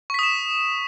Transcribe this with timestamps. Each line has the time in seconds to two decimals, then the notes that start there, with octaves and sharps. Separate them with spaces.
0.10 C#6
0.14 B6
0.19 D#6
0.23 E7